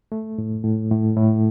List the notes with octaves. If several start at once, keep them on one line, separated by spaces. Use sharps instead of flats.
A3
A2
A2
A2
A2